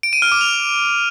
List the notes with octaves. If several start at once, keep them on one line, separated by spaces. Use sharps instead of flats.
D7
D#7
F6
D6
F7